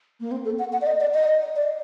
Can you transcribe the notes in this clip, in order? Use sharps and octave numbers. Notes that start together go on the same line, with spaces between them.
A#3
C4
A4
F#5
F#5
D5
D#5
D5
D#5
D5